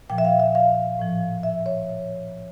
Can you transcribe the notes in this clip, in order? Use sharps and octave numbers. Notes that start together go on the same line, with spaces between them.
A#2 F3 G5
E5
F5
E5
F5
A2 F3
E5
C#5